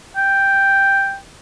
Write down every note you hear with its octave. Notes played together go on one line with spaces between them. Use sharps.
G5